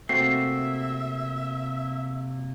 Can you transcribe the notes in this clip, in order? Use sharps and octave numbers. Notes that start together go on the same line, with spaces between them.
C3 A3 A#3 C4 F#4 E5 C7